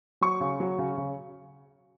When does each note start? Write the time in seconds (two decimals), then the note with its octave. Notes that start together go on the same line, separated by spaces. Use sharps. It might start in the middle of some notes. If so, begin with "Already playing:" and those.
0.21 F#3 C#6
0.40 C#3
0.60 F#3
0.78 C#3
0.97 C#3